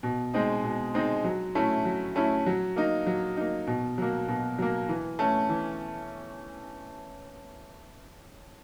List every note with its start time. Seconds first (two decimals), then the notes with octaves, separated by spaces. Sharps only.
0.03 B2
0.34 G#3 C4 D#4
0.63 B2
0.94 G#3 C4 D#4
1.24 F#3
1.55 A3 C#4 E4
1.85 F#3
2.16 A3 C#4 E4
2.46 F#3
2.76 A#3 D#4
3.07 F#3
3.37 A#3 D#4
3.67 B2
3.98 F#3 A#3
4.28 B2
4.58 F#3 A#3
4.89 E3
5.19 A3 C#4
5.49 E3